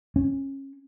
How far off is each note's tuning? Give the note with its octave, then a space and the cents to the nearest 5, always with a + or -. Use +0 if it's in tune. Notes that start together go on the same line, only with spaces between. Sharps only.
C#4 -25